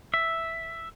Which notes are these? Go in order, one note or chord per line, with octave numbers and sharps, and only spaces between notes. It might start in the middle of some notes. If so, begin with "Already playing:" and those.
E5